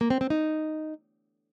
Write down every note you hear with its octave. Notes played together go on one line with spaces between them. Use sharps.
A#3
C4
C4
D#4